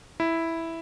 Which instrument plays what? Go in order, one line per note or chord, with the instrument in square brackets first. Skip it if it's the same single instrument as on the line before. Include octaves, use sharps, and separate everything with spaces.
[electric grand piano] E4